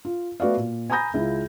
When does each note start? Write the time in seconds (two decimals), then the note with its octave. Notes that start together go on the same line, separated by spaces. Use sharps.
0.05 F4
0.40 A3 B3 F#4 D5 F5
0.57 A#2
0.90 G#5 A#5 B5 D#6 G6 A#6
1.14 C#2 E4 F4